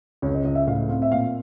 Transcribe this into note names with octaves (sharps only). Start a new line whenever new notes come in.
C#2 C#5
D#5
C#2 D#5
E5
A2 F5
C4 F5
E5
A#2 F5